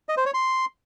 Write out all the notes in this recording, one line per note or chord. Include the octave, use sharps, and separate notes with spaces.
D#5
C5
C#5
C6